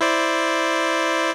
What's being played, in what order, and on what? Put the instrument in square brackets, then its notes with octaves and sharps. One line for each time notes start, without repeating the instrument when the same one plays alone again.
[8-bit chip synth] E4 C5 D5